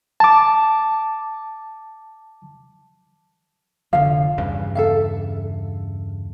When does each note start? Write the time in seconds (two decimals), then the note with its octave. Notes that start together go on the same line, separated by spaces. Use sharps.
0.20 A5 D6
3.93 F1 D3 F3 F5
4.38 E2 G2 C#3
4.75 A4 E5 F5